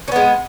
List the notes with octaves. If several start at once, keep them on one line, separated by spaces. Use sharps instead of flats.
G#3 B3 C#4